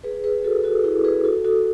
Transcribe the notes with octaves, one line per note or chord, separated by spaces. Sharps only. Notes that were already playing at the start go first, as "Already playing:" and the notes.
G#4 B4
G#4 B4
F#4 A4
F#4 A4
E4 G#4
G#4 B4
F#4 A4
F#4 A4